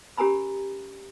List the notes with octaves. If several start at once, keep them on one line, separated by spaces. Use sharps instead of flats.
C#4 G4 A#4 G#5 A#5 B5